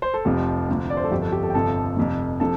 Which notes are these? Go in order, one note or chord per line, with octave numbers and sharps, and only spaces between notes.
C5
A4
F1 F2 C3 F3 G4
D2 C3 F3
D5
C5
A4
G1 F2 F3 G4
A4
G4
A4
G5
G1 F2 C3 F3 A4 A5
F1 F2 C3 F3
C3 F3 A4 A5